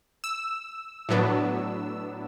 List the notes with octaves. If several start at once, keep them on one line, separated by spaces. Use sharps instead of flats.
E6
A2 F#3 B3 D4